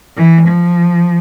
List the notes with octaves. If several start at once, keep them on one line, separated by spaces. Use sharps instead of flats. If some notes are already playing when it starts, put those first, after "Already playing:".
E3
F3